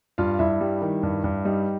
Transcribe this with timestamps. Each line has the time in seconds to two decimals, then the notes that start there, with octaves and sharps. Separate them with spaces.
0.18 G2 F4 F5
0.39 G2 E4 E5
0.61 G3
0.82 D#3
1.03 G2
1.24 G2
1.45 G3 D#4 D#5